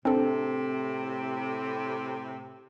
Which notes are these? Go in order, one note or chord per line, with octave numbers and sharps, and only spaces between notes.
A2 C3 C4 D4 A4